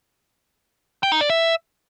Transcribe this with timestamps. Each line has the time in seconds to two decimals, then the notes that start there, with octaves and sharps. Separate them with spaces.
1.03 G5
1.12 D#4
1.21 D5
1.30 E5